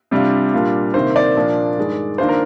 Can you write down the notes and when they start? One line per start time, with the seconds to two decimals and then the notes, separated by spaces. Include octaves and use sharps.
0.11 C3 G3 D4 F4
0.54 A#2 G3 D4 F4
0.94 C3 D#3 A#3 C5
1.16 D5
1.36 A#2 F3 A#3 D4 F4
1.77 G2 D#3 G#3
2.18 D#3 A#3 D4 F4 C5
2.29 A#4